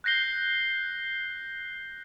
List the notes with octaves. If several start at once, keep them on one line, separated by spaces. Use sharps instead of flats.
F#6 G6 A#6 C7 G7